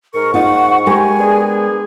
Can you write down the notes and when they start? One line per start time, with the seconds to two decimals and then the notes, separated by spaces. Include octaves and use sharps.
0.14 G#2 A#4 C#6
0.34 D#4 F4 F#5
0.86 G#3 G4 A#4 G#5
1.19 B3 D4 G#4